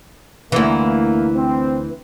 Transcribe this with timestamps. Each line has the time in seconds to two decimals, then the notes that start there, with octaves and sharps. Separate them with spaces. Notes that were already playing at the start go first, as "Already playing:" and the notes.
0.52 D2 E3 A#3
1.36 C4